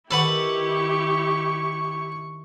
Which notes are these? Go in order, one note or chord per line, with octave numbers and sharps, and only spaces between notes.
D#3 E4 G4 A4 B4 F#5 C#6